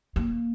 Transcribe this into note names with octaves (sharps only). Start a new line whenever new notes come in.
A#3